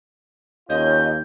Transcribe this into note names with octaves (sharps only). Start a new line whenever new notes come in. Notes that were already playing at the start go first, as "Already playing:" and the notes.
D#2 C#4 F4 D#5 G6